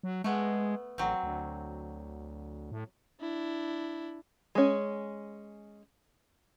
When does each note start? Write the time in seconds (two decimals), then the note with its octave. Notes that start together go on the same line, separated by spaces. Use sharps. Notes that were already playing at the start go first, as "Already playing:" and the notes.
0.03 F#3
0.24 G#3 A3 B3
0.98 A1 F#3 C4
1.23 D2
2.72 A2
3.21 D4 E4
4.55 G#3 C#4